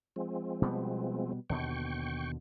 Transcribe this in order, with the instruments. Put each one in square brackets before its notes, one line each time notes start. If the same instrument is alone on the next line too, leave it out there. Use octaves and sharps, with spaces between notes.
[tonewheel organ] F3 G#3 C4
[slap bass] B2 G3 B3
[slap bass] D#2 B2 D3 [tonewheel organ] G5 C#6